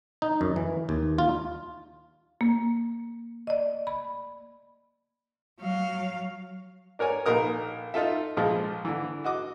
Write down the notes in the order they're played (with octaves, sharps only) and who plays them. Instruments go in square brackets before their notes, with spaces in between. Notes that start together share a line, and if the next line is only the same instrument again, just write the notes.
[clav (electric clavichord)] D#4
F#2
E3
D#2
F4
[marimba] A#3
D5 D#5
B5
[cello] F#3 F5
[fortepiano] D4 A#4 C#5 G#5
A#1 D#4 A#4 D#6
D#4 F4 A4 E5
A#1 F3 G#3
D3 E3
F#4 D#5 D6